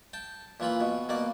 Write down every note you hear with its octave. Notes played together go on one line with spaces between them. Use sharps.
G5 A5
A#2 E3 F4 B5
B2
B2 A#3 D5